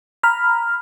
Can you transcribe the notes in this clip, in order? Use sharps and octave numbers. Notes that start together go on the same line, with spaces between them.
A#5 B5 F6